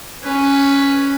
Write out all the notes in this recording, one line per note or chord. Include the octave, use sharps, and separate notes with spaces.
C#4 B4